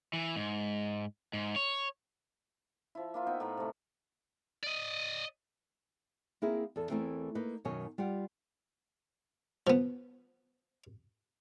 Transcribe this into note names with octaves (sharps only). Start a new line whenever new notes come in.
E3
G#2
G#2
C#5
F3 E4
A#3 E4 F4
B3 D#4 G5
A2 A#5 B5
C3 A3
D5 D#5
A#3 C4 E4 G#4 A#4
E2 A4
E2 C#3 E3 A3 C4 A#4
A#3 D#4 B4
F#2 B2 D#3 C#5 G#5
G3 F4 G4 F#5
F3 B3